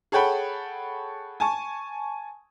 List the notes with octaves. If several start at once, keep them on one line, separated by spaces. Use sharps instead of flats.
G#4 A4 C#5 F#5 G5 B5
G#5 A5 C#6